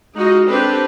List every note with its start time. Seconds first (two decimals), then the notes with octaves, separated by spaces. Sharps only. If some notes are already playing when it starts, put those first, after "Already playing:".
0.15 G#3 D#4 F4 F#4 D#5
0.48 C4 D4 G4 A4 B4 C5